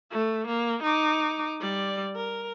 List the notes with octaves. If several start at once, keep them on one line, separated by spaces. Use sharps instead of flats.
A3
A#3
D#4 D6
G3 D5
A#4